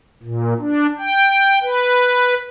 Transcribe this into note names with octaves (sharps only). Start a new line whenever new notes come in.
A#2
D4
G5
B4